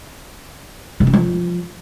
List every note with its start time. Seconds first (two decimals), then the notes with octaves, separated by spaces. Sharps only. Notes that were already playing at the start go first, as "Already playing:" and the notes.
1.00 B2
1.07 C#4
1.13 F3